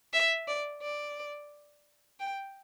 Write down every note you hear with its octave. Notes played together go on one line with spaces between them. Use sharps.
E5
D5
D5
G5